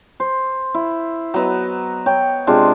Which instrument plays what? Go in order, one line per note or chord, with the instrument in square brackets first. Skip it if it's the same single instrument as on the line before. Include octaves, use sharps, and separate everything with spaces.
[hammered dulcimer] C5
E4
F#3 B3 D#5
C#5 G5
C3 G#3 D4 F4